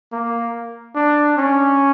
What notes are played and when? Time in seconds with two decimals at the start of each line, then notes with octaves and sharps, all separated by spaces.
0.12 A#3
0.95 D4
1.37 C#4